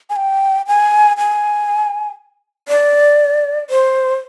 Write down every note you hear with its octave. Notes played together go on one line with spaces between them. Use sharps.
G#5
G5
G#5
G#5
D5
C5